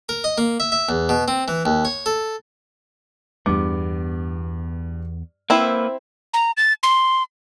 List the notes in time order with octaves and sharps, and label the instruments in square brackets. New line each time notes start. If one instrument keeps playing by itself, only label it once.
[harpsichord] A#4
D#5
A#3
E5
E5
E2
B2
C4
E3
D#2
C#5
A4
[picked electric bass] E2 B3 [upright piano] G2 D6
[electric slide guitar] A#3 B4 [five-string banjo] C4 E4
[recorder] A#5
A6
C6